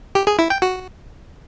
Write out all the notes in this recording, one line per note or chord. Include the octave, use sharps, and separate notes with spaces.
G4
G#4
E4
G5
F#4